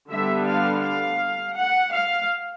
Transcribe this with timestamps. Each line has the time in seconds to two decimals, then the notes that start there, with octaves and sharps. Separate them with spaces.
0.11 D3 G3 B3 D4 E5
0.47 F5
0.83 F5
1.55 F#5
1.92 F5